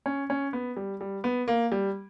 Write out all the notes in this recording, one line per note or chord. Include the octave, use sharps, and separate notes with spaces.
C#4
C#4
B3
G3
G3
B3
A#3
G3